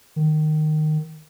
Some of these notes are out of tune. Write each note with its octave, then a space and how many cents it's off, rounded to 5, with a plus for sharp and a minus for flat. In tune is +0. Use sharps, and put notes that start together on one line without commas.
D#3 -15